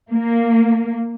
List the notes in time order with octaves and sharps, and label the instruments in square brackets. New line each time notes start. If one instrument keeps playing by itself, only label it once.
[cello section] A#3